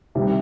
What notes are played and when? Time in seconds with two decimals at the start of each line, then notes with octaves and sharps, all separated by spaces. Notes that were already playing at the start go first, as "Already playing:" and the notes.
0.15 C2 C3 D#3 G3